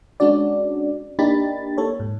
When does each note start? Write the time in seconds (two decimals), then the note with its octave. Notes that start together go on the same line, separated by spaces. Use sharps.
0.20 G#3 C#4 D4 F#4 D5
1.19 A#3 D4 D#4 G4 B5 A6
1.77 A#3 A4 C#5
2.00 G#2